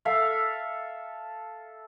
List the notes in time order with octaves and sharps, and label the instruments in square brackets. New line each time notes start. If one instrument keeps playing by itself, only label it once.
[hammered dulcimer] A4 E5 F5